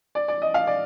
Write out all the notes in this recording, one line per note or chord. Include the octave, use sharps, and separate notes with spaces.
D5
D5
D#5
F5
D5